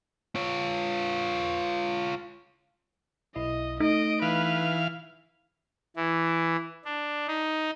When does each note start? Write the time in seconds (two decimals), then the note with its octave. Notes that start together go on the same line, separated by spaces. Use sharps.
0.36 F4 C#5
3.36 B1 E4 D#5
3.80 A3 D#4 D#5 D7
4.22 E3 B4 F5
5.96 E3
6.85 D4
7.27 D#4